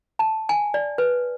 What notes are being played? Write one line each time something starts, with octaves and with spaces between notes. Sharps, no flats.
A5
G#5
D5
B4